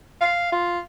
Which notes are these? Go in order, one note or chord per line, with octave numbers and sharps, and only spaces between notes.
F5
F4